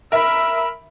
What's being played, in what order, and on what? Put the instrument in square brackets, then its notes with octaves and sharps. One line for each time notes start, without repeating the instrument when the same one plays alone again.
[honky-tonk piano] A#4 E5 [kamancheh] B5 E6